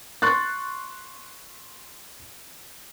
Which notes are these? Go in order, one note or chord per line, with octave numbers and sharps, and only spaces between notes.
C6 C#6 F#6 A6